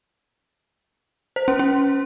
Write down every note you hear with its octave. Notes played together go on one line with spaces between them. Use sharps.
C5
C#4
C#4